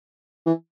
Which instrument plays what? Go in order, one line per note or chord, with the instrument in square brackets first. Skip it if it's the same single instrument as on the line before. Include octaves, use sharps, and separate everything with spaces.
[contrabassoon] E3